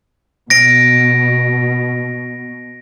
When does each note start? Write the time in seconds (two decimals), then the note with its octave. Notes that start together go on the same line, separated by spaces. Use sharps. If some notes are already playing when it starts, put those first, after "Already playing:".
0.50 B2 A#6 D7